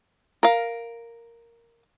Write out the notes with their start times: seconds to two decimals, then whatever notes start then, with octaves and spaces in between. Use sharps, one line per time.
0.43 A#4 F5